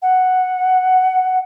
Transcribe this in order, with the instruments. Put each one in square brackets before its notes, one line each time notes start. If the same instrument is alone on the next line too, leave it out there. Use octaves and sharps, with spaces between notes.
[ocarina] F#5